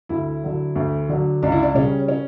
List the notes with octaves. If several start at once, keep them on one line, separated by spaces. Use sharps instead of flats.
D2 E4
D3 F#3
D2
D3 F#3
C#2 D4
E4
D4
C#3 G3 C#4
C#4